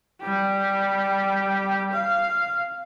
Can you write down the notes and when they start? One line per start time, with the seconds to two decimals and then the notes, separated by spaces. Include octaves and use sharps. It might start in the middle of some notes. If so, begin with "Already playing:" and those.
0.21 G3 G4
1.92 F5